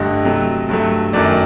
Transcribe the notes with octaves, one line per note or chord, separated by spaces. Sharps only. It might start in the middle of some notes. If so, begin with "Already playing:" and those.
Already playing: G2 D3 A3 D#5
C3 F#3 A3
G2 F#3 A3
F#2 D#3 F#3 A3 D5